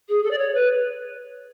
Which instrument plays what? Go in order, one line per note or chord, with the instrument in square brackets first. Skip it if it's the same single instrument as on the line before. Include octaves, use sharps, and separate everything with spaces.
[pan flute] G#4
A4
D5
C#5
B4